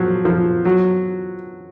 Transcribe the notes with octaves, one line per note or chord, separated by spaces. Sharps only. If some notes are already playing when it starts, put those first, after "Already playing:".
Already playing: F3 F#3
F3
F#3